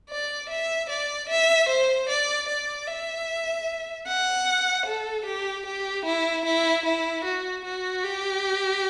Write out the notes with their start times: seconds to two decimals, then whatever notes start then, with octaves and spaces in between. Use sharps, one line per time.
0.10 D5
0.50 E5
0.90 D5
1.29 E5
1.69 C5
2.09 D5
2.48 D5
2.87 E5
4.08 F#5
4.86 A4
5.25 G4
5.66 G4
6.05 E4
6.45 E4
6.85 E4
7.25 F#4
7.65 F#4
8.03 G4